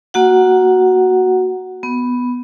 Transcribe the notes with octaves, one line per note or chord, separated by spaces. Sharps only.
A#3 F#4 F#5
B3